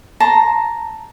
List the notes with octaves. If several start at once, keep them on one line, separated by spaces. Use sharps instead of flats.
A5 A#5 C6